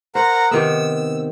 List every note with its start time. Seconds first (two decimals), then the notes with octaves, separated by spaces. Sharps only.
0.15 A#4 C5 F#5 A#5
0.51 C3 D#3 B3 E6